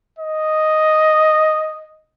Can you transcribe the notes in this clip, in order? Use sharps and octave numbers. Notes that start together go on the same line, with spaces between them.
D#5